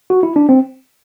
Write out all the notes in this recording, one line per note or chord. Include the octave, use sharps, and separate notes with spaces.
F#4
E4
D4
C4